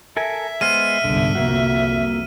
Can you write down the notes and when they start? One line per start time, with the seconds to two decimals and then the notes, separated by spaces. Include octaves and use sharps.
0.17 A4 A#4 E5 G#5
0.61 G#3 B3 C5 F6 D#7
1.04 G1 C2 G#2 D3
1.35 C2 F2 A#3 F#4